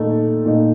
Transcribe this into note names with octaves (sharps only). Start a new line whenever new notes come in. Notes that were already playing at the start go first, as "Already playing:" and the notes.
Already playing: A#2 A3 D#4
A#2 A3 D#4